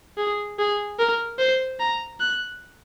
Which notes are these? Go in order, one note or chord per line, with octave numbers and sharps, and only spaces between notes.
G#4
G#4
A#4
C5
A#5
F#6